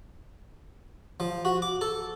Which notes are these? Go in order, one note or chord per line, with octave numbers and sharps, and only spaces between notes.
F3
F#4
D6
A4